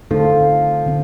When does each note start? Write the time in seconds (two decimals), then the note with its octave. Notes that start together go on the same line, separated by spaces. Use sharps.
0.11 D3 F3 A3 C4 D#4 A4
0.86 D3 A3 C4